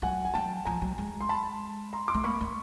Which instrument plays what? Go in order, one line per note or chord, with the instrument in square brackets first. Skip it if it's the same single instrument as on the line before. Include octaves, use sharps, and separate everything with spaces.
[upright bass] F#3 [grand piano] F#5 G#5
[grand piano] G#5
[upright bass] F#3 [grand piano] G5 A5
[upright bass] F3 [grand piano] G#5 A#5
[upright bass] F#3
G#3
[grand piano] C6
A5 B5
A#5 C6
C6 D6
[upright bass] A3
[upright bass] A#3 [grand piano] B5 C#6
[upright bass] A3